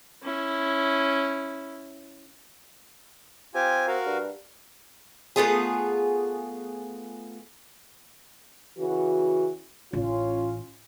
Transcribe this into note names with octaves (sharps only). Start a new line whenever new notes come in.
C#4 E4
C4 F4 G4 G#5
F#4 A#4 F5
G2
A3 B3 F4 G#4
C#3 E3 F#4
A1 C#4 F4